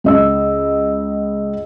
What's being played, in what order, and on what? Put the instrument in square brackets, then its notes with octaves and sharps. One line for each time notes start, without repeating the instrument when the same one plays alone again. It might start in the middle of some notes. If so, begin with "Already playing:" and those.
[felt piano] C#2 D#5 E6